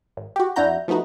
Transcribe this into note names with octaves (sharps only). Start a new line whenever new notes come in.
G#1
F#4 G4
F2 D4 E4 F#4 A#5 G6
F3 A3 B3 D#4 F#4